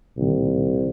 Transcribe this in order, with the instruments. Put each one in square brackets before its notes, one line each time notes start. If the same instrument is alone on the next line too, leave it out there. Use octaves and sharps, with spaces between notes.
[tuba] C2 [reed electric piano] A#2 D#3